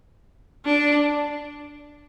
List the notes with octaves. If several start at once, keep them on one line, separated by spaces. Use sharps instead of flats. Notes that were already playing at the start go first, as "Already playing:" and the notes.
D4